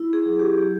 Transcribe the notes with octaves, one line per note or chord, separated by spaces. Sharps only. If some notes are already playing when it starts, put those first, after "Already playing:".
Already playing: E4
G#4
F#3
G4